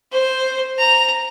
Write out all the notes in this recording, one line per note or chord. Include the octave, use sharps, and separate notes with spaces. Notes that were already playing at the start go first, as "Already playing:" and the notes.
C5
A#5